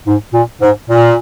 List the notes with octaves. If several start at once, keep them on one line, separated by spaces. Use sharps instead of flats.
G#2
A#2
G#2
A#2